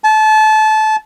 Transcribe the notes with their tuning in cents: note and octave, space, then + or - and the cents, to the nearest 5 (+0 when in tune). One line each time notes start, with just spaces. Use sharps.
A5 -25